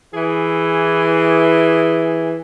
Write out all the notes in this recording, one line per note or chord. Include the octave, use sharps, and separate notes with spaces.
E3 G#4